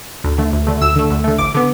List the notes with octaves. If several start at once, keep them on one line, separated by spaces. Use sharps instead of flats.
D2
D3 A3
D2
D3 A3
D2 E6
D3 A3
D2
D3 A3
A1 D6
D3 B3